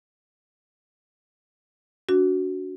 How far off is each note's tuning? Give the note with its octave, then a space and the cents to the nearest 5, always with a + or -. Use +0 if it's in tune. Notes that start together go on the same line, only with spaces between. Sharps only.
D4 -30 F#4 +0